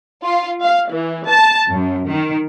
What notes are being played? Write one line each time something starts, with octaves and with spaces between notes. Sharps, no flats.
F4
F5
E3
A5
F#2
D#3